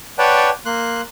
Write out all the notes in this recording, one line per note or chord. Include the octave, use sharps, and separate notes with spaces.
B4 C#5 D5 F#5 G5 A5
A#3 C6 F#6